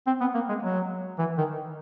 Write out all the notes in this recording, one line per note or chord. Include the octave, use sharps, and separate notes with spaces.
C4
B3
A#3
G#3
F#3
E3
D#3